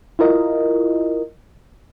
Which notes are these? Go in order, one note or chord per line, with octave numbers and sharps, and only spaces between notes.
E4 F4 A#4 D#5